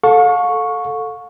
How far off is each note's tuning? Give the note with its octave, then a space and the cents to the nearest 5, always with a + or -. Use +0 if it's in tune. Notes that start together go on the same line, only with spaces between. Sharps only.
A4 +0 F5 +40 C#6 +0